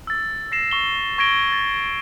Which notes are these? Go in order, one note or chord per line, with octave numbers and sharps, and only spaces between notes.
E6 A6
A#6 C7 E7
C#6 G7
C#6 G#6 A#6 D7 G7
A6